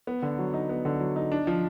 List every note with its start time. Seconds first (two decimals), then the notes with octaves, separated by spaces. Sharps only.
0.07 B3
0.22 D3
0.39 F#3
0.54 D#4
0.69 B3
0.85 D3
1.00 F#3
1.16 D#4
1.32 D4
1.47 F3